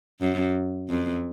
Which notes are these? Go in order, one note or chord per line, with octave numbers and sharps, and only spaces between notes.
F#2
F2